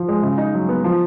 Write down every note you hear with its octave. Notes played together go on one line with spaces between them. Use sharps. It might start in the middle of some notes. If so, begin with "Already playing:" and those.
Already playing: F3
G#3
C#3
D#4
F#3
B3
F3